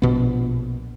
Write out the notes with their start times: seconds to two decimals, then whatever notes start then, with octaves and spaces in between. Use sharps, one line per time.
0.02 A#1 B2 B3